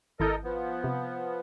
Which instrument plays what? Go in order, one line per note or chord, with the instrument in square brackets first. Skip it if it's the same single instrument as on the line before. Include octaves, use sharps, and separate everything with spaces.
[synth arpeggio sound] G#1 E4 G6 [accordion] A4 A#4 D#5
[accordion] F3 B3
[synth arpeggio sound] C3